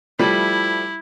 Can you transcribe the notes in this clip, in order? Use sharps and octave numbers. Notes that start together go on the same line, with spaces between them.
F3 G3 A3 E4